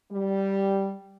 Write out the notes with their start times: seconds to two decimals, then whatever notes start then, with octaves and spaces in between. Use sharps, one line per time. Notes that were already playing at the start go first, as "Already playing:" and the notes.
0.12 G3